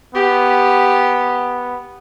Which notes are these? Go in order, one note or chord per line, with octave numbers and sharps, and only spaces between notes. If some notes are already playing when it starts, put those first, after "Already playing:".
B3 G4